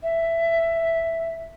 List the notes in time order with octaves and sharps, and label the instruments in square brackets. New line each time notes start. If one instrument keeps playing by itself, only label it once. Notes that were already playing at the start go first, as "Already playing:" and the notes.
[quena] E5